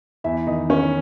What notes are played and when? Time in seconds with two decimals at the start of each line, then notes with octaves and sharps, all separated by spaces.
0.24 E2 E4 E5
0.47 D#3 D#4 D#5
0.70 D#3 C#4 C#5